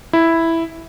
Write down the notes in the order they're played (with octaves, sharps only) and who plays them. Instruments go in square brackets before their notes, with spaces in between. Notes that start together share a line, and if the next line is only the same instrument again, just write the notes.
[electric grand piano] E4